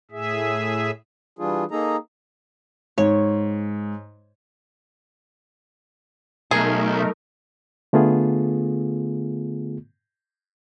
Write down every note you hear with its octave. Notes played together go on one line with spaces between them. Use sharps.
A2 G#4 E5
E3 G3 D4 F4 G#4
A#3 D#4 G#4 A4 A#5
G#2 C#5
B1 A3 D#4 G#4 A#4
D3 A3 B3 F4 G#4